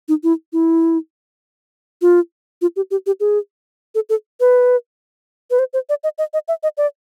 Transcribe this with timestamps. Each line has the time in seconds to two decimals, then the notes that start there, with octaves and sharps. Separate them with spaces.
0.09 D#4
0.23 E4
0.53 E4
2.02 F4
2.62 F4
2.76 G4
2.91 G4
3.06 G4
3.20 G#4
3.95 A4
4.09 A4
4.40 B4
5.51 B4
5.59 C5
5.73 C5
5.89 D5
6.04 D#5
6.18 D#5
6.34 D#5
6.48 E5
6.63 D#5
6.77 D5